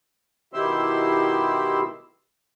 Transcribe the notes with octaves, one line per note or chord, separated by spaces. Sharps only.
B2 D#3 E4 G4 C6 E6